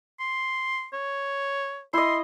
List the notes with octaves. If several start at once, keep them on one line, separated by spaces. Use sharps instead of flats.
C6
C#5
E4 D#5 C6